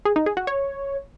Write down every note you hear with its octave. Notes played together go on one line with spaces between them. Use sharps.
G#4
D#4
G#4
F#4
C#5